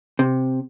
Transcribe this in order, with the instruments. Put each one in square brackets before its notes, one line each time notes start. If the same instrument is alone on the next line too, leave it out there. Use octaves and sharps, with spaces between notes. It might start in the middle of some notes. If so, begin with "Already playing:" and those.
[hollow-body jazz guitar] C3